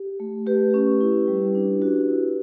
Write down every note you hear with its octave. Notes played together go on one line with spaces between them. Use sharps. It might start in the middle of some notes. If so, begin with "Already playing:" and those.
Already playing: G4
A3
A3 G4 B4
C#4
E4
G3
D4
F#4
E4